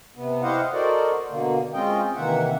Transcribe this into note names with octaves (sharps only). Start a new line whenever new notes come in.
C3 B3
E4 G4 C5 D#5 F5 F#5
F#4 A4 A#4 C5 D5 D#5
B2 D3 A#3
G#3 C4 C#4 F4 D#5 G5
C3 D#3 E3 A#3 E5 F#5